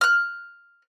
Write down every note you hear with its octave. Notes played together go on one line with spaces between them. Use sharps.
F6 F#6